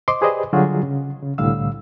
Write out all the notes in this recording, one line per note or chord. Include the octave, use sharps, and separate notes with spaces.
C5 D#5 C6 D6
G4 G#4 B4 C5 D5 D#5
D3 F#3 G3 F4 F#4 G#4
C#3
C#3
C2 A2 D3 G3 F5 E6